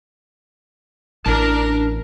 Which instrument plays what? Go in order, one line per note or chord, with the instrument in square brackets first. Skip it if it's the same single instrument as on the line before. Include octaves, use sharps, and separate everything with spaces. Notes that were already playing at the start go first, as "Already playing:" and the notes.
[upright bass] A1 [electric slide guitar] D4 A5 [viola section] A#4